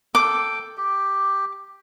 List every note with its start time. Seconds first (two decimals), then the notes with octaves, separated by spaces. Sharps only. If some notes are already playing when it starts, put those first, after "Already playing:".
0.15 A4 G5 D6
0.77 G4